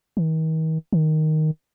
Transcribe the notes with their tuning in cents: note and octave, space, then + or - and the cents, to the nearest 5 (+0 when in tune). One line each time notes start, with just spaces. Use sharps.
D#3 +40
D#3 +0